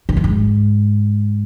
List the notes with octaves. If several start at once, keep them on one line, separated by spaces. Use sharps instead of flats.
G#2
G2
G#2